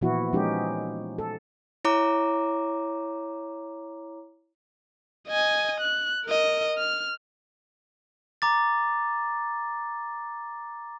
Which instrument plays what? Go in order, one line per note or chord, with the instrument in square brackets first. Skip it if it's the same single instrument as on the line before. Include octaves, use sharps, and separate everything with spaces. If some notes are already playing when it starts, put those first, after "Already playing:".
[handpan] A#2 E3 F3 B3 E4 F#4
F3 G#3 C#4 D#4 G4
A4
[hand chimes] E4 C#5 A#5 D6
[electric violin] D#5 G#5
F#6
A#4 D#5
F6
[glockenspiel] A#5 D6 A6